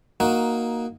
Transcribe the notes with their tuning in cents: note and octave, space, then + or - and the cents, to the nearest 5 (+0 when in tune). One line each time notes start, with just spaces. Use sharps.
A#3 +5 D#4 +10 F#4 -5